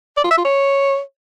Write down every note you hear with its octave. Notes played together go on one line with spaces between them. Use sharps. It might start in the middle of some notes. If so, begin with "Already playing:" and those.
D5
F4
E5
F4
C#5